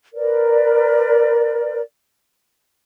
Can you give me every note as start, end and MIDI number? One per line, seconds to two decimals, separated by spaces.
0.15 1.80 70
0.15 1.80 71
0.15 1.80 74